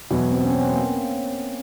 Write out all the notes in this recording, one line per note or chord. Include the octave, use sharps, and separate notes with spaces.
E2 B2 F#3 B3
C4
C#4
C4
A#3